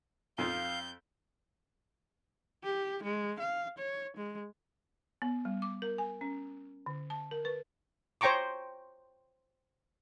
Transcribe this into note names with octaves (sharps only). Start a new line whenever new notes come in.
F2 F3 F5 G6
G4
G#3
F5
C#5
G#3
B3
G3
D6
A#4
G#5
C#4
D3
A5
A#4
B4
C5 C#5 G5 A#5 C#6 D6